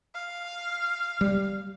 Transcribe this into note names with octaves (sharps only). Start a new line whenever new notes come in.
F5
G3